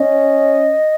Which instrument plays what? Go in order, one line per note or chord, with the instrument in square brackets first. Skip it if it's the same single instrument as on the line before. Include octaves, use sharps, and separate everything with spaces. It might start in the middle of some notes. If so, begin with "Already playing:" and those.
Already playing: [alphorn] C#4 [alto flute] D#5